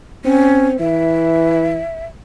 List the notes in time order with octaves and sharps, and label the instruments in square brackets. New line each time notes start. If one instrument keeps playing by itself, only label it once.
[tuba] C4 [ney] C#4
[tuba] E3 [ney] E5